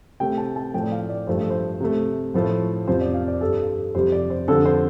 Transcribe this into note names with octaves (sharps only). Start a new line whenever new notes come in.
C3 A3 G5
A5
A5
A2 F3 A3 G5
D5
F5
D5
G2 F3 A3 C5
A4
C5
C3 A3
A2 F3 A3
F2 C3 F3 C5
D5
F5
D5
G2 G3 A4
F2 C3 G3 C5
D5
C5
F2 D3 G3 A4
C5